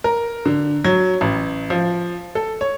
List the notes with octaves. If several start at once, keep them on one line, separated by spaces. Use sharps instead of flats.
A#4
D3
F#3
A1
F3
A4
C#5